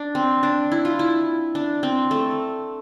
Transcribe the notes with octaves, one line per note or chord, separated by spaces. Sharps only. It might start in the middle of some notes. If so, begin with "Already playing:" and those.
Already playing: D4
C4
D4
E4
F4
E4
D4
C4
A3